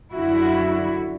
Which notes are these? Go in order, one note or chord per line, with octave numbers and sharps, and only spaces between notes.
F#2 D3 E4 F#4